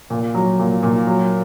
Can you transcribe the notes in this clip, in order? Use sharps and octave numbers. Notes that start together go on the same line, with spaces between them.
A#2
F#3
A#2
A#2
F#3